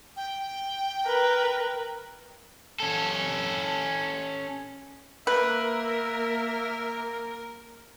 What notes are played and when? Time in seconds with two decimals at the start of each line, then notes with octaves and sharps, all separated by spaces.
0.17 G5
1.05 A#4 B4
2.80 C#4 A4
5.27 A#3 A#4 B4 E5